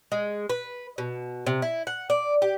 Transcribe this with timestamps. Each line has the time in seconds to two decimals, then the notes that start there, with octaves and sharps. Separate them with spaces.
0.12 G#3
0.50 B4
0.98 B2
1.46 C3
1.62 E4
1.87 F#5
2.10 D5
2.42 G4